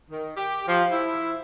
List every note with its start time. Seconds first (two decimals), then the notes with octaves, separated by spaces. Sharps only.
0.10 D#3
0.37 G4
0.67 F3
0.91 E4